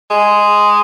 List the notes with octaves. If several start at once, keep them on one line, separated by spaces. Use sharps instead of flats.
G#3